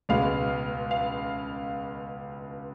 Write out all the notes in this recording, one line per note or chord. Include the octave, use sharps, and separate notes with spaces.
C#2 B2 G#3 B3 F5
F5